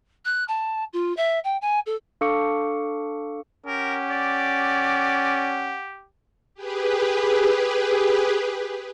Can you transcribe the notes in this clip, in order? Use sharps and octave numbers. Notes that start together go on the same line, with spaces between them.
F#6
A5
F4
E5
G5
G#5
A4
D4 A4 F5 C#6 D6 C#7
C#4 G4 A#4 F#5
D5
G4 G#4 B4